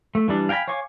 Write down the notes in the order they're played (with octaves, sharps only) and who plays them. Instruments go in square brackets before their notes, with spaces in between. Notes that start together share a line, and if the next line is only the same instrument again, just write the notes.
[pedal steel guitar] A3
E3 G3 D4
F5 G5 G#5 A#5 B5
C#5 F5 G#5 C#6 D6